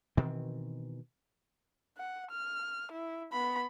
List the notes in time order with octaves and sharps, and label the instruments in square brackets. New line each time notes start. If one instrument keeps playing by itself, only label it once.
[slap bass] B2 D#3 E3 C4
[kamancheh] F#5
F6
E4
B3 B5